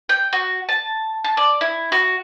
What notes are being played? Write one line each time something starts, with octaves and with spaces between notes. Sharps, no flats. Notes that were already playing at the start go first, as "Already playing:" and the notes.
G5
F#4
A5
A5
D5
E4
F#4